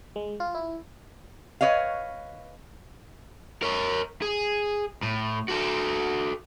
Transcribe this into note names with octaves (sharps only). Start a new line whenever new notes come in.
G#3
F4
E4
B4 C#5 D#5 F5
A#4 C#5
G#4
A2
F#4 A4